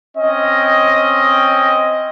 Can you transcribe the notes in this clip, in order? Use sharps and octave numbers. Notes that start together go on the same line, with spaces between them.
C4 C#4 D#5